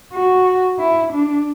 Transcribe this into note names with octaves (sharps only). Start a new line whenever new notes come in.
F#4
E4
D4